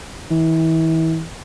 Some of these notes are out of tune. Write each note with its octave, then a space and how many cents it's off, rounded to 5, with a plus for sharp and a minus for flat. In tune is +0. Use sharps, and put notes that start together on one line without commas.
E3 -35